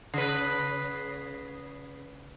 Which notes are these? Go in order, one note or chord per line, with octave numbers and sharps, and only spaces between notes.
C#3 B4